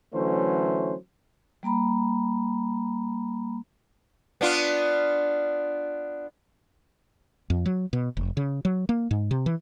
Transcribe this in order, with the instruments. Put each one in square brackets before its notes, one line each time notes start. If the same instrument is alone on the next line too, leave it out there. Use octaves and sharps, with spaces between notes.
[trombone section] D3 E3 F#3 A3 C#4 C5
[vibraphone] G3 A#3 A#5 B5
[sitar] B3 D4 F4
[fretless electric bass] F2
F#3
B2
F1
C#3
F#3
A#3
G#2
C3
E3